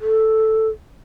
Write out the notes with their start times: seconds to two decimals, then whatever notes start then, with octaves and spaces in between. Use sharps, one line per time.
0.01 A4